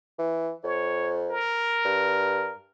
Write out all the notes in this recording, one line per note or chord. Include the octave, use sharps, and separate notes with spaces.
E3
F2 C#5
A#4
G2